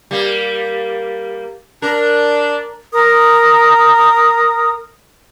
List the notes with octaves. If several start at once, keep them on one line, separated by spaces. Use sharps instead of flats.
G3 A#3
D4 A#4
A#4 D#6